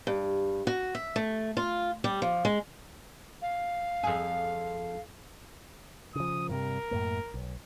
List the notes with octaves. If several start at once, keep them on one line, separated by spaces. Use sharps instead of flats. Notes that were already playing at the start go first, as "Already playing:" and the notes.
G2
F#4
E5
A3
F4
G3
F3
G#3
F5
F2 G#4
C#3 F3 D#6
G2 C3 G3 A#4
F#2 A2 A#3
B1